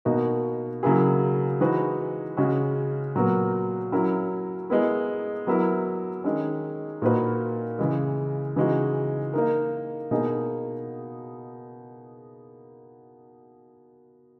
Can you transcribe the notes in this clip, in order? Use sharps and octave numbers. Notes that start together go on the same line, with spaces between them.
B2 A#3 D#4 F#4 A#4
C#3 F#3 A#3 E4 G#4
E3 G#3 D#4 F#4 B4
C#3 G#3 C#4 F#4
A#2 F#3 B3 F#4 A#4
F#3 C#4 E4 A#4
G#3 B3 E4 A#4
F#3 B3 E4 A#4
D#3 G#3 C#4
A#2 A#3 D#4 F#4 B4
C#3 E3 G#3
C#3 E3 G#3 D#4 F#4
A#3 D#4 A#4
B2 A#3 D#4 G#4